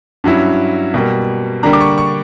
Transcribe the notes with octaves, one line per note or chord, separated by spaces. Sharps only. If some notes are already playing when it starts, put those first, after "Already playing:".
G2 F#3 C#4 E4
B2 G3 A#3
D3 G3 A#3 D4 A#5
D6
C#6
C#6